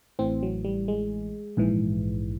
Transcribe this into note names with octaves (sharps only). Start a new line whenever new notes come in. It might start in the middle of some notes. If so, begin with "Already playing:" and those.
A1 A2 E3 C4
F#3
G3
G#3
A#1 G#2 E3